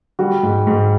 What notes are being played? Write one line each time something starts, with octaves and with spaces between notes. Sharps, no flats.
G3 F#4
G#2
G#2